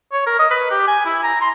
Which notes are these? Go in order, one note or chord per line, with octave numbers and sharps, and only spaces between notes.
C#5
A#4
D#5
B4
G4
G#5
E4
A#5
C6